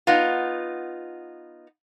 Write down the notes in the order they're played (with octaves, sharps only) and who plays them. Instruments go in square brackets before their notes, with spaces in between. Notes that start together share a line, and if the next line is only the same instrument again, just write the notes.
[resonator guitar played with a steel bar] B3 D#4 F4